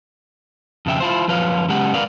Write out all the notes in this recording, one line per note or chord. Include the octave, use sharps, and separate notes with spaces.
F2 C#3 E5 G5
E4 F4 C5
F#2 F3 B4 C#5 F5
F#2 C#3 G#3 B3 G4 F#5
A#4 B4 D5 F5